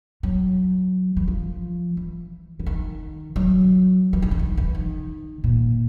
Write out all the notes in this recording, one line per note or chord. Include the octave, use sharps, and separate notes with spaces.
F#3
E3
F3
E3
D3
D#3
F#3
E3
D#3
D3
D#3
E3
D#3
A#2